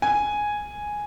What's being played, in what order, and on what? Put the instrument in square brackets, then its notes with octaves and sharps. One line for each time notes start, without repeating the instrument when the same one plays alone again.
[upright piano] G#5